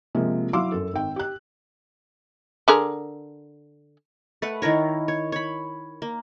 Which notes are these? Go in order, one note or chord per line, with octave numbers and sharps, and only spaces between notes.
C3 F3 G#3 A#3
F#3 E4 F5 C6 D6 E6
F#2 A4
G#1 G5
G4 F#6
D3 G#4 A#4
A3 B4 F#5
D#3 E4 A#4 C#5
C#5
C#5 B5
A#3